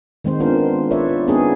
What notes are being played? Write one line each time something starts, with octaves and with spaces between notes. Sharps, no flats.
D#3 G#3 C4 C5
B3 D4 F4 A#4 C5
F4 B4 C#5 D5 E5
F4
B3 C4 D4 D#4 G#4